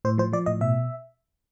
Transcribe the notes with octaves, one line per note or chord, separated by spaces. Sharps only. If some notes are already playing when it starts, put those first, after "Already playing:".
A2 C5
F3 C5
F3 D5
A2 D#5
B2 E5